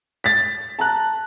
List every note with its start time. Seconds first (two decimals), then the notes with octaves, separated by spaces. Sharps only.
0.24 A6 B6
0.79 A5 A#5 F#6